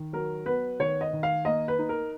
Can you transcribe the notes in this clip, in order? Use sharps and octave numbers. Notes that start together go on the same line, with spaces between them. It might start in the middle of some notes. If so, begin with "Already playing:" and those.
Already playing: D#3
F#3 A#4
B3 B4
D#3 C#5
D#5
D#3
F5
A#3 D#5
B4
D#4
A#4